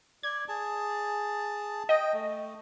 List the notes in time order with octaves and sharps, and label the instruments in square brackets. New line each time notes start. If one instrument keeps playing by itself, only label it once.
[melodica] D5 [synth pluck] G#6
[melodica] G#4 A5
[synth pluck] D#5 [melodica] G5
[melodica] A3